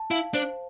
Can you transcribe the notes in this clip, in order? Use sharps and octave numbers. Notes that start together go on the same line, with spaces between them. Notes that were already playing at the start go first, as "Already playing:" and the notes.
Already playing: A5
E4 F5
D4 C5